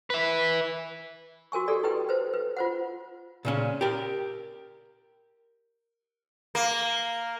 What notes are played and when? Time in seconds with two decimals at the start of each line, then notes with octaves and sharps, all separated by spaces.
0.10 B4 E5
1.52 F#4 A#4 G#5 C#6
1.68 G4 A4 D5
1.83 E4 G4 B4 G5
2.09 B4 C5
2.34 B4
2.57 F4 C5 F#5
3.45 A#2 C#3 C#4
3.81 G4 A#4
6.55 A#3